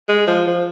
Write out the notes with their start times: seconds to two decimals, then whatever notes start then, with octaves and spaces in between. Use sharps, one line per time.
0.09 G#3
0.27 F3
0.47 F3